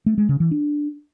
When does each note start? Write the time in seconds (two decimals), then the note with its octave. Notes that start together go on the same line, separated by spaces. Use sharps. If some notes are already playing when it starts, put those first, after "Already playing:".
0.06 A3
0.18 G#3
0.29 C#3
0.40 E3
0.51 D4